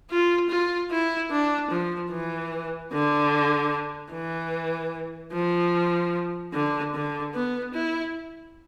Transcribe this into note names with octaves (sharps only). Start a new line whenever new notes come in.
F4
F4
E4
D4
F3
E3
D3
E3
F3
D3
D3
B3
E4